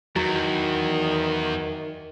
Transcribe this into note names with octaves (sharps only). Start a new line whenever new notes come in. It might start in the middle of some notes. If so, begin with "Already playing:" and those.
E2 D#3 F#3